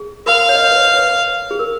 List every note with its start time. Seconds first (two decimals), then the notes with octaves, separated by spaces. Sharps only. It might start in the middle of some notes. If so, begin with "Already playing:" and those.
Already playing: G#4
0.26 A#4 F5
0.49 C#5
0.55 D#5
0.63 C#5
0.71 B4
0.82 C#5
0.93 B4
1.51 G#4
1.59 A#4